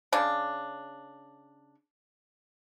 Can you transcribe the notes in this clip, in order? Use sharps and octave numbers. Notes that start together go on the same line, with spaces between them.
C#3 D4